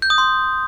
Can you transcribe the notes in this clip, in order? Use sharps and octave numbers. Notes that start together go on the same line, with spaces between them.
G6
D#6
C6